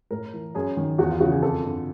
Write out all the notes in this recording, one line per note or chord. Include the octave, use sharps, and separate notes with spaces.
A2 A#4
E3
F#2 G#4
D#3
E2 F#4
F4
C#3 E3 F#4
G#4
F2 A4
D3